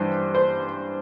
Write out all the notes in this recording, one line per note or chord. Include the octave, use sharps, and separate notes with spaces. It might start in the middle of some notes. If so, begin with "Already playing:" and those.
Already playing: G2 E3 C5
C5